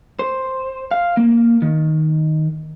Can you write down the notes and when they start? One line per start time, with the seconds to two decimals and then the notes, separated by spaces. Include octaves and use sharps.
0.19 C5
0.91 F5
1.17 A#3
1.62 D#3